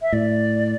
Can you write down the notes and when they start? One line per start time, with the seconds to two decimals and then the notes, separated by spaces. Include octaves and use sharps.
0.01 E5
0.12 A2 D5